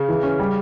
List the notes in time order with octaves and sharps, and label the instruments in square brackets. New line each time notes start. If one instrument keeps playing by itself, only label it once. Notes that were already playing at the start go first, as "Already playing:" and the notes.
Already playing: [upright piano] C#3
[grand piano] E3
C#4
G3